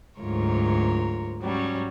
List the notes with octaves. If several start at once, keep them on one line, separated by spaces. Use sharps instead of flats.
D2 G#2 F#3 F4 A#4 C#5
G#2 F#3 G3 C#4